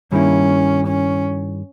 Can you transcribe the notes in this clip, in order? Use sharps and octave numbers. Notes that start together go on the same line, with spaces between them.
G2 D#3 G3 A#3 C#4 E4
C#4